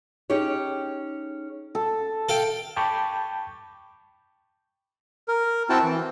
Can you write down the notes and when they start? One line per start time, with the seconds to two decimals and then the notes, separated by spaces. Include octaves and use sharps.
0.30 C#4 D#4 G4 G#4 C#5
1.75 A4
2.29 A4 F5 G5
2.76 G5 A5 B5 C#6 D6 G6
5.28 A#4
5.70 C4 E4 F#4 G5 A5
5.83 E3